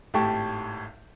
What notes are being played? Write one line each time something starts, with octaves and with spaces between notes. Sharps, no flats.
G#1 A2 G4 A5 C#6